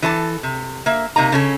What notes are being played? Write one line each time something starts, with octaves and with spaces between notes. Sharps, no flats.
E3 A4 C5 A5
C3
A#3 E5
C3 A#3 D#4 A#5
C#3 C#4 A4